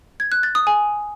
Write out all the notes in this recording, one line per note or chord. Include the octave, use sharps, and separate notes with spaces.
G#6
F#6
A6
D#6
G#5